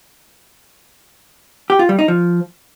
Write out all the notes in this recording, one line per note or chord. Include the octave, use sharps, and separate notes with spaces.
G4
F4
G3
D#4
F3